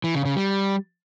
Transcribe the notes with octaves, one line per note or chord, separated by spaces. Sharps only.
E3
C#3
C#3
G3